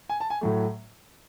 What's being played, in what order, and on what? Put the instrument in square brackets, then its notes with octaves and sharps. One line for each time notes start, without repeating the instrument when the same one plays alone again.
[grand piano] G#5
A5
G#5
A2 F#3 A3